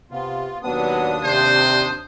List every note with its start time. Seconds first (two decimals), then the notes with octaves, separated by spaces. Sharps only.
0.11 C3 B3 F4
0.62 D#2 B2 F#3 B3 D4 D#6
1.24 C3 C5